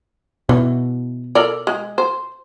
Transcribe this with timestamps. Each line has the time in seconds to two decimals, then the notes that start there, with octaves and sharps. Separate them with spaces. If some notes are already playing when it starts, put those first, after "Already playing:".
0.49 B2 E3
1.35 A4 A#4 D5
1.67 G#3
1.98 C5